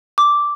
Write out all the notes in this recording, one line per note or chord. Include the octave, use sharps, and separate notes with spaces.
D6